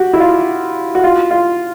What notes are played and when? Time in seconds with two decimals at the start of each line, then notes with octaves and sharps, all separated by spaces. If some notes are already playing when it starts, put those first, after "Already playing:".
Already playing: F#4 G4
0.13 E4
0.20 F4
0.95 F#4
1.04 F4
1.31 F4